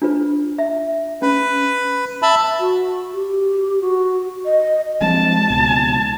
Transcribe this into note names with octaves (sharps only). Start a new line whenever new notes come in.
D4 F4 B4
E5
C#4 B4
E5 A5 B5
F#4
G4
F#4
D#5
F3 G#3 C4 A5
C#2 B2